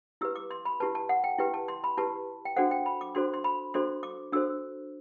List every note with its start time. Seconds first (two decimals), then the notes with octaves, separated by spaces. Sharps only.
0.21 E4 G4 B4 E6
0.36 D6
0.51 C6
0.65 B5
0.80 E4 G4 B4 A5
0.95 A5
1.09 F#5
1.24 G5
1.39 E4 G4 B4 G5
1.54 A5
1.68 C6
1.84 B5
1.97 E4 G4 B4 A5
2.45 G5
2.57 D4 F#4 A4 C5 F#5
2.71 G5
2.86 B5
3.01 D6
3.15 D4 F#4 A4 C5 C6
3.33 C6
3.44 B5
3.74 D4 F#4 A4 C5 C6
4.03 D6
4.32 D4 F#4 A4 C5 E6